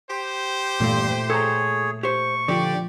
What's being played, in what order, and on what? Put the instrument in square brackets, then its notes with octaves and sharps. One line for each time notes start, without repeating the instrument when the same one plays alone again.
[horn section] G4 C5
[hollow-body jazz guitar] E2 G2 [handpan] A#2 A3
[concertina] G#4 C#5 [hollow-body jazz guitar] A4 A5 A#5
[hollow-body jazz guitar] G4 C5 [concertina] C#6
[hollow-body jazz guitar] D3 [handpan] F3 F4 [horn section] G4 D5